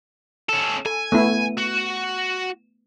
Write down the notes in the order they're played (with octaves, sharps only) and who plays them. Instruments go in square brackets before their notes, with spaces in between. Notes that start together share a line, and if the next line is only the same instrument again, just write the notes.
[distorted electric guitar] C#4 A4
[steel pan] A4 [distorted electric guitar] G#5
[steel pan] A3 B3 E4
[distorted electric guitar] F#4